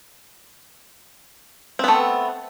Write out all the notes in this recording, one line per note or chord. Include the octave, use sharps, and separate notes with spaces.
A3 B3 C4